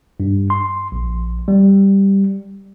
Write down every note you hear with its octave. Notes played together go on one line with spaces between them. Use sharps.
G2
C6
A#1
G3